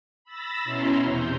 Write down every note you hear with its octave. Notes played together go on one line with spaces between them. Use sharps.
B5 E6 A6 A#6
B2 C#4 E4 A#5 C6
E2 C3 G6